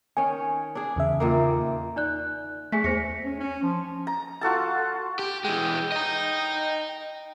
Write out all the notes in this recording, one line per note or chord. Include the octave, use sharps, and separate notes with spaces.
D#3 C#4 G#5
D4 G#4
E2 C#3 E5
A#2 D#3 A#3
D#4 D5 F#6
A3 G#4 G#5 B6
E2 C5 A#6 C#7
C#4
C#4
F3
A#5
F4 F#4 A4 A5
G4
E3 G#3 G5
D#5 A#5